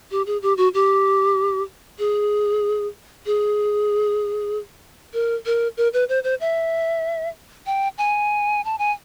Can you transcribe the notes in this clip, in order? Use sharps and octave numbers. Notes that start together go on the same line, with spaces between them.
G4
G#4
G4
F#4
G4
G#4
G#4
A#4
A#4
A#4
B4
C5
C5
E5
G5
G#5
A5
G#5